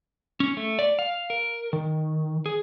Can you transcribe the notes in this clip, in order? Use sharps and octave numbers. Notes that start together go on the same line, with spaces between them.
C#4
A3
D5
F5
A#4
D#3
G#4